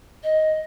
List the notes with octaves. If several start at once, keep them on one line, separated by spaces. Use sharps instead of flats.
D#5